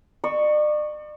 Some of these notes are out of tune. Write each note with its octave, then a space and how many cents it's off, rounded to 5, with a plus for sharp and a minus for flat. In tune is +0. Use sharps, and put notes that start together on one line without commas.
D5 +40 C#6 +0 E6 +0